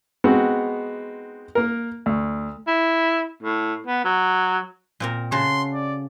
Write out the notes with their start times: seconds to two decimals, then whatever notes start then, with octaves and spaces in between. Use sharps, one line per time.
0.24 G#3 B3 C4 D#4 F#4
1.55 A#3 A#4
2.06 D2
2.67 E4
3.43 A2
3.86 B3
4.05 F#3
5.00 A#2 C4 A#4
5.32 C#3 F#4 A4 C6
5.74 D5